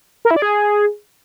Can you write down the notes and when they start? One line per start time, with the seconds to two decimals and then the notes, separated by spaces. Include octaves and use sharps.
0.25 A#4
0.31 E4
0.36 D5
0.42 G#4